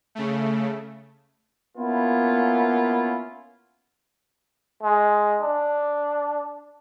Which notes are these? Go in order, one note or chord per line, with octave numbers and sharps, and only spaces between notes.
C#3 A3
A#3 B3 C#4 E4 F4
G#3
D4